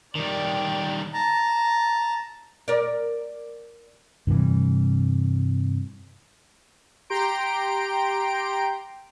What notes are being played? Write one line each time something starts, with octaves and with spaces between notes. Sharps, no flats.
D#3 G3 D5 G5
A5 A#5
A#4 D5
G2 C3 E3 G3
G4 G5 A#5 C6 D7